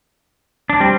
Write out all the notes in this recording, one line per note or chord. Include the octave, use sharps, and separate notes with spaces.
D4
G3 C4